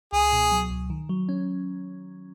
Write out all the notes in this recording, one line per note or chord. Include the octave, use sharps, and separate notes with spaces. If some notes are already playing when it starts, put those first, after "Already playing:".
C#2 G#4
B2
F#3
C#2
D#3
F#3
C#4